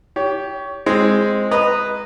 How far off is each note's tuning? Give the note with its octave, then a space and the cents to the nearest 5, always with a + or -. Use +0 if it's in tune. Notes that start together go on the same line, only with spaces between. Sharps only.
G4 +0 C#5 +25
G#3 +0 C4 +5
B4 +0 D#5 -10 A#5 -10